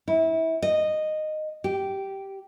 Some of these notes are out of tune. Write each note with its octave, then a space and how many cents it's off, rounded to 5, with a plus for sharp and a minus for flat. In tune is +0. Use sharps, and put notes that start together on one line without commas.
E4 -25
D#5 -10
G4 -10